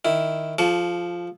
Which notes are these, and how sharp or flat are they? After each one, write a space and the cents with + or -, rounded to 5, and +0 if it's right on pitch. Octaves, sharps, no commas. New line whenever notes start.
D#3 -5 E4 +0
F3 +0 A4 -35 C#6 +45